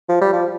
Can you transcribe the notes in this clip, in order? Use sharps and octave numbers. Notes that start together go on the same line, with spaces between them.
F3
G3
F3